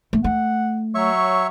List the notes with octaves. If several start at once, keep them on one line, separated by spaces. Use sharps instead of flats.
A3
A3 F#5
F#3 C#5 E5 C#6